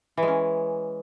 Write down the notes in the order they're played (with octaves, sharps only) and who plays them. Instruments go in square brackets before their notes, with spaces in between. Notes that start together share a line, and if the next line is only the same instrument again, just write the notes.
[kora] E3
G#3
C#4